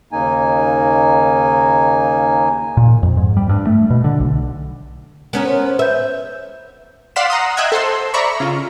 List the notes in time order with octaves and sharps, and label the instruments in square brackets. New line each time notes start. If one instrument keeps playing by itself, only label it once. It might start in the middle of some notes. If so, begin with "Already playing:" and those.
[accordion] D#2 C#3 A#3 D#4 G#5
[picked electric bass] A#2
F2
G#2
G3
G2
A3
B2
D3
B1
[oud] B3 C#4 A#4
[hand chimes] C5
[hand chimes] B4 G6 [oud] E5
[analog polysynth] D5 F5 F#5 C6 B6 E7
F#5 A#5 C6 D#6
D#5 E5 G5 E6 F#6 G#6
A4 C5 C6 E6
D5 E5 A#5 B5 C#6
C#3 F4